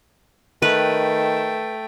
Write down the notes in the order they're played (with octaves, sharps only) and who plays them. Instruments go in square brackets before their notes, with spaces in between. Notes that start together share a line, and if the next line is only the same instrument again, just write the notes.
[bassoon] D#3 [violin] A3 G5 [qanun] B4